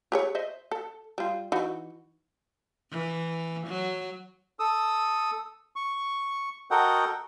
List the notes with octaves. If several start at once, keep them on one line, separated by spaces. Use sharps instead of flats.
G4 G#4 C#5
C5 D#5 E5
A4
G3 F4
E3 D#4 F#4
E3
F#3
A4 D#6 E6
C#6
F#4 A4 A#4 D#5 F#5 G5